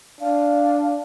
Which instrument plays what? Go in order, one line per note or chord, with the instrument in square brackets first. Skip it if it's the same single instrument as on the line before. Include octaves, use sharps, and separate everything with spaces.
[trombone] D4 [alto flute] F5